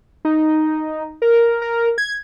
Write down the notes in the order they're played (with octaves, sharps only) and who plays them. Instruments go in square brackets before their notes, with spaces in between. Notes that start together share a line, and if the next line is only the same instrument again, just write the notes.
[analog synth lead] D#4
A#4
A#4
G#6